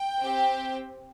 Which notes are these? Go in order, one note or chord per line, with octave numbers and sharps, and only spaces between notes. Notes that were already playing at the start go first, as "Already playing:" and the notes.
Already playing: G5
C4 G4